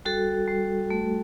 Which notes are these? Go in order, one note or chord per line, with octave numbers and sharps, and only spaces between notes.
G3 F#4 A4
G3
A3